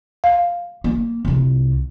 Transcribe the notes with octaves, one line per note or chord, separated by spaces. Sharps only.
F5
A#3
C2 F4